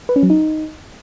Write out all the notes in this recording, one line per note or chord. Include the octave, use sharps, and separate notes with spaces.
B4
C#4
F#3
D#4